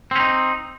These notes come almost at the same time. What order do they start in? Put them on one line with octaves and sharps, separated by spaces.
C4 C#4 D#4